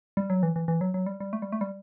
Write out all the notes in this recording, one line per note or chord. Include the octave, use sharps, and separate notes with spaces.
G3
F#3
E3
E3
E3
F#3
F#3
G3
G3
A3
G3
A3
G3